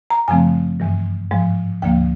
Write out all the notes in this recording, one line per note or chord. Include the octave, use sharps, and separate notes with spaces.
A#5
F#2 C#3 F3 A3 C4 G#5
G2 E3 G#3
G#2 F3 G#3
D2 D3 F3 A#3 G5